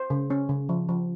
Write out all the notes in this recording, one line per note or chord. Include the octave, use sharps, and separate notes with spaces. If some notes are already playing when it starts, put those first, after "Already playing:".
Already playing: C5
C#3
C#4
C#3
F3
F3